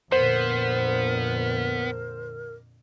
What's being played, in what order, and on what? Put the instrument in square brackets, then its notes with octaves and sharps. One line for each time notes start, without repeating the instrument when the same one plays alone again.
[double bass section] F2 A#2 D3 [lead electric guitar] B3 [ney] A#4 [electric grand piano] C5